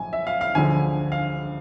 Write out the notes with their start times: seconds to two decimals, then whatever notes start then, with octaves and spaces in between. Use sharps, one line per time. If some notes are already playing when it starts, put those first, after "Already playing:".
Already playing: B1 A2 F3 G#5
0.13 E5
0.27 F5
0.41 F5
0.55 E1 D2 D3 F3 G#5
1.12 F5